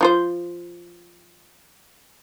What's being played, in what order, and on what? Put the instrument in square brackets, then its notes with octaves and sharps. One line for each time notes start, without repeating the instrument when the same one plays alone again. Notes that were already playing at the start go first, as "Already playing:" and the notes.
[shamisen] F3 F4 C5